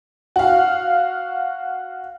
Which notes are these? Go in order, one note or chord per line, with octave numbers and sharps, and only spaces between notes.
F#4 F5